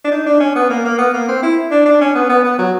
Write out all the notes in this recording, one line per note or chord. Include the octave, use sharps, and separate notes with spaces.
D4
D#4
D4
C#4
B3
A#3
A#3
B3
A#3
C4
E4
D4
D4
C#4
B3
B3
B3
F#3